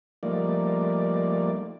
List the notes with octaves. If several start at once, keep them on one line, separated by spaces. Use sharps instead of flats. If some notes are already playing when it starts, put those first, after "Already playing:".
F3 G3 A3 A#3 D#4 D5